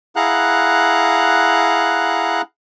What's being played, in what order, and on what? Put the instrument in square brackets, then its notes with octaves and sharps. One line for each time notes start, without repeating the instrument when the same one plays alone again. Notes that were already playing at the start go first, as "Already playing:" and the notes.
[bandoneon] E4 G#4 F5 F#5 A#5 F#6